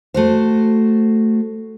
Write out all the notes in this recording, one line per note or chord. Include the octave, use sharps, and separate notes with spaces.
A3 F#4 C5